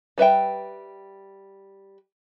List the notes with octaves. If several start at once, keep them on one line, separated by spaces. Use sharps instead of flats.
G3 B4 E5 G5